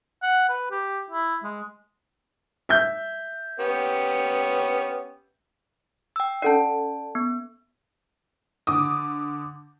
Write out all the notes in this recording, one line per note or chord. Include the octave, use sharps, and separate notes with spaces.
F#5
B4
G4
E4
G#3
E5 G6
B3 C#4 G4
G5 E6
C#4 A4 D5 F#5 A5
B3
D3 D6 D#6